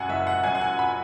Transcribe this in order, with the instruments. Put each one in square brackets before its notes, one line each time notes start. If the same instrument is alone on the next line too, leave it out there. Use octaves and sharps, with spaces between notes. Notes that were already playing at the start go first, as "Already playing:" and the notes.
Already playing: [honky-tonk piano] F#2 F#5 G#5
F#1 E5
F#5
F#2 G#5
F#5
G#5
B5